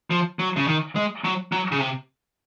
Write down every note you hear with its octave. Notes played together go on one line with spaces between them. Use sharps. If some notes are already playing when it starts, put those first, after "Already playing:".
F3
F#3
C#3
D#3
G#3
F#3
F#3
C#3
C3